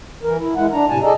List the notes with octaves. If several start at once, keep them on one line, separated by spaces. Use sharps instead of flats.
E3 A#4
E4
G#3 E4 F#5
D4 A#5
A2 C3 G#5 A5
G#4 A4 D5 D#5 A#5